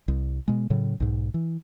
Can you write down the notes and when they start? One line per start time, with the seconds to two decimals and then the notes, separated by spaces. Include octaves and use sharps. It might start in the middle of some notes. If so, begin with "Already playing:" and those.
0.08 C2
0.48 B2 G#3
0.70 A2 C#3 F#3
1.00 B1 G#2
1.34 E3